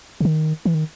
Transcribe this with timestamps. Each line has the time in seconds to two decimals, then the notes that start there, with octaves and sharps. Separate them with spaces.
0.21 C#3
0.25 D#3
0.65 E3
0.74 D#3